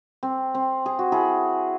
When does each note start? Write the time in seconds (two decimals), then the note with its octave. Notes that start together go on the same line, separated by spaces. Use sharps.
0.23 C4
0.55 C4
0.86 G#4
0.99 F#4
1.12 E4 G#4